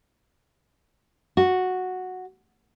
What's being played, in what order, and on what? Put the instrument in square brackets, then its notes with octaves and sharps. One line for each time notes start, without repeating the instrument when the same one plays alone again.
[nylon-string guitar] F#4